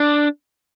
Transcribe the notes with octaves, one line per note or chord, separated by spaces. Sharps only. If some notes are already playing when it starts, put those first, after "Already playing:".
Already playing: D4